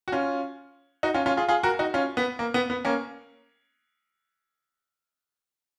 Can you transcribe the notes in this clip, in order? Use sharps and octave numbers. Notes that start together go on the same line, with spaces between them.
F#4
C#4 F4
D#4 F#4
C#4 F4
C#4 F4
F4 G#4
F4 G#4
F#4 A#4
D#4 F#4
C#4 F4
B3
A#3
B3
B3
A#3 C#4